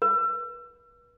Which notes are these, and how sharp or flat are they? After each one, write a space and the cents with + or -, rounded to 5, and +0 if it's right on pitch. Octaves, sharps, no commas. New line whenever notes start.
B4 -40